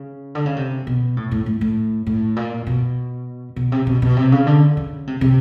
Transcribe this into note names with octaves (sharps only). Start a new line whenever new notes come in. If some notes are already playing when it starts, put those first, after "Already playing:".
Already playing: C#3
D3
C#3
C3
B2
A2
A2
A2
A2
A2
A#2
B2
B2
C3
B2
B2
C3
C#3
D3
C#3
C3
C3